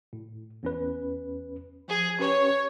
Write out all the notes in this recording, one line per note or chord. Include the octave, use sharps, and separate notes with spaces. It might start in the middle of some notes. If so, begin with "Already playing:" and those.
A2
E2 C#4 B4
F3 G#4
C#4 G4 B4 C#5